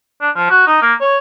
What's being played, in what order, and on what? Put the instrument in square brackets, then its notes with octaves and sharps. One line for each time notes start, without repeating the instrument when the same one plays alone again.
[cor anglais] D4
F3
F#4
D#4
A#3
C#5